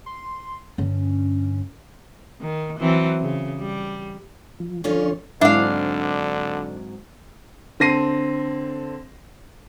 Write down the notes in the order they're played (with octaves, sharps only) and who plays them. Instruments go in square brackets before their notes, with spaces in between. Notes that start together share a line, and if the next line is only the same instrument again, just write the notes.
[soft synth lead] C6
[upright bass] G2 D3 [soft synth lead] C#4
[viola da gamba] D#3
E3 F#3 C4
C#3
G3
[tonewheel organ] F3
[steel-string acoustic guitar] D3 C#4 F4 [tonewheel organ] F3 D4 C#5
[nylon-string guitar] G#2 F#3 C4 [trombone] D3 [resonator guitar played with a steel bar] D4 F5 [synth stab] E4
[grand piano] D3 C4 A5 A#6 C7 D#7